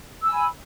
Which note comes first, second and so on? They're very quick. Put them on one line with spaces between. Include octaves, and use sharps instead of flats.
E6 G#5 B5